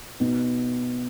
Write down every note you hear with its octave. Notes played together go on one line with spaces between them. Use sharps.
B2 B3 D#4